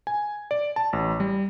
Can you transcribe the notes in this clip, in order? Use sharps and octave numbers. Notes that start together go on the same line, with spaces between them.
G#5
D5
A5
A1
G3